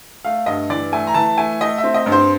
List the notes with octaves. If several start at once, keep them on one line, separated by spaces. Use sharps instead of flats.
A3 F5
G2 D#5
E3 D5
A3 G#5
A#5
E3 A5
A3 G#5
A3 D#5
E5
C4
D#5
G2
C5